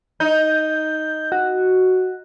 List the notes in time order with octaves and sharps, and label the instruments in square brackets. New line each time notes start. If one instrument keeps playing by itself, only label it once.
[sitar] D#4 [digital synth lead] G6
[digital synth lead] F#4